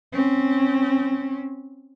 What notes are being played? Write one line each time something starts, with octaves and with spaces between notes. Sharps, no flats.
C4 C#4